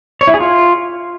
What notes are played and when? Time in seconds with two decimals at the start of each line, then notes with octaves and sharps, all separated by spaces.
0.21 C#5
0.27 E4
0.34 G#4
0.40 F4